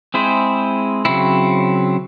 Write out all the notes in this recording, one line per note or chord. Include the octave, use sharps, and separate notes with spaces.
G#3 C4 E4 G#4 C5
C#3 F#3 C4 E4